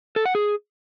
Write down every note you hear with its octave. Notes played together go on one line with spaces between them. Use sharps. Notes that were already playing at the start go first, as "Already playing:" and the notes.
A4
F#5
G#4